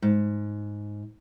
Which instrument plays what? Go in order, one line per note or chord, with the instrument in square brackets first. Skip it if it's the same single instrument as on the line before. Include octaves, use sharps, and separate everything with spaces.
[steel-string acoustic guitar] G#2